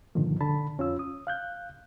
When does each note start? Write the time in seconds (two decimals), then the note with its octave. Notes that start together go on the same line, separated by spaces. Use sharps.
0.15 G2 A#2 D3 D#3 F3
0.41 D3 A5 B5
0.78 F2 C#4 F4 E6
0.99 D#6
1.27 F5 F#6 G6